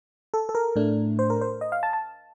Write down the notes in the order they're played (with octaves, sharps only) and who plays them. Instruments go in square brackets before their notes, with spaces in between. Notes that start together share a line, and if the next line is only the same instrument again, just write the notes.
[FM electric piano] A4
A4
A#4
A2 A3 D4
C5
A#4
C5
D#5
F5
A5
A5